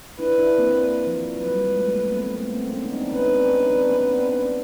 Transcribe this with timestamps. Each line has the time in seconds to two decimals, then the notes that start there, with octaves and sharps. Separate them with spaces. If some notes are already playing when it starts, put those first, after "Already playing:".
0.19 D4 E4 B4
0.38 D4 E4
0.58 A#3 C4
1.07 F3
1.36 F#3 B4
1.51 G3
1.66 G#3
1.80 A3
1.95 A3 B3
2.10 A#3 C4
2.24 A#3 C4
2.38 A3 B3
2.54 A#3 C4
2.73 B3 C#4
2.85 D#4
2.92 C4 D4
3.12 C#4 D#4 B4
3.32 C4 D4
3.51 C#4 D#4
3.71 C4 D4
3.90 B3 C#4
4.09 C4 D4
4.30 D4
4.42 C#4